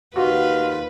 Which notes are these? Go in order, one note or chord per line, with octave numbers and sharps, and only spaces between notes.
D#2 F4 F#4 B4